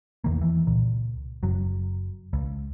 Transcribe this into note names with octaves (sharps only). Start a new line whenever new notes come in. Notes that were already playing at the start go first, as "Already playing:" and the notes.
E2 D#3 A#3
E3
C#2 A#2
F#1 F#3
C#2